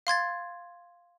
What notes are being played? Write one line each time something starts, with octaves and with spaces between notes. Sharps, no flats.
F5 C6 G#6 A6